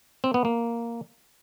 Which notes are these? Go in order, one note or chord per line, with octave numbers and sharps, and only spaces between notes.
C4
B3
A#3